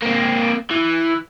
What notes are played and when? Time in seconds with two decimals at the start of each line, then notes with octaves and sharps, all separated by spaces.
0.02 A#3 C4
0.71 E3